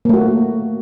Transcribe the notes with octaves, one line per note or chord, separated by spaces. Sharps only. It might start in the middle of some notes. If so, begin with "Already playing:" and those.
A3 A#3 F#4